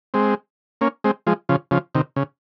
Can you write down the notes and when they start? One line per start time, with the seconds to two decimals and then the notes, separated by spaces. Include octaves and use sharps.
0.14 G#3 C4
0.81 A#3 C#4
1.04 G#3 C4
1.27 F3 G#3
1.49 C#3 F3
1.71 C#3 F3
1.95 C3 D#3
2.16 C#3